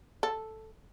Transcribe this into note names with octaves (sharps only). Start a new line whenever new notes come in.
A4